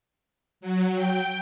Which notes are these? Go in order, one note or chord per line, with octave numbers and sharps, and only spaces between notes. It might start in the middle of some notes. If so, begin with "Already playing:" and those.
F#3
G5